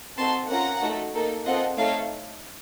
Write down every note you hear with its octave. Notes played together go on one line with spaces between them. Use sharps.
C4 D#4 F#4 A4 A5 C6
A#3 C#4 F4 F#5 A#5
A3 D#4 F#4 A4
A#3 D#4 A4
C4 F4 A4 D#5 F#5
A3 D#4 A4 C#5 F5